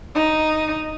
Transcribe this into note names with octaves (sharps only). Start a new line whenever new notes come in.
D#4